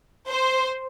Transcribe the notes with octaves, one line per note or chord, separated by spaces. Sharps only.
C5